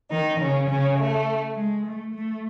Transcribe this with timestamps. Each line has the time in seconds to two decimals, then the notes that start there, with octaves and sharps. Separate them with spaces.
0.10 D#3 D#4
0.39 C#3 C#4
0.68 C#3 C#4
0.97 A3
1.55 G#3
1.85 A3
2.14 A3